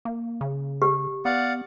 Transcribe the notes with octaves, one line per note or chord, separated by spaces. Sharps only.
A#3
C#3
G4
B3 D5 F5 F#5